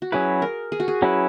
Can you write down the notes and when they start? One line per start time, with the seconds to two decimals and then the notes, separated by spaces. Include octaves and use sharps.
0.02 F#4
0.12 F#3 C#4 E4 G#4 B4
0.42 A#4
0.72 G#4
0.80 F#4
0.88 G#4
1.02 F#3 C#4 E4 B4